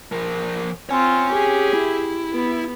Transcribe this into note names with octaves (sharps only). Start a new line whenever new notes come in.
F3 A#4
C4 F4 C#5 G#5
G4 G#4
E4
B3